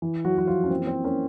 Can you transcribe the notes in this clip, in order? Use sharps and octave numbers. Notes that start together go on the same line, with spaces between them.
E3
F#3 F#4
E3 F#4
F3 F4
C#4
A#3 C4
C4
A#3 C#4